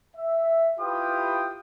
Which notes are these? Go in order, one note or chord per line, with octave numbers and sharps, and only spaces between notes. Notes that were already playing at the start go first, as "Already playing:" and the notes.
E5
E4 F4 G4 B4 G5 D#6